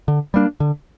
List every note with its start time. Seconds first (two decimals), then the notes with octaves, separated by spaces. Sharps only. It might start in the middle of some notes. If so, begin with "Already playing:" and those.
0.08 D3
0.34 G3 A#3 D4
0.60 D3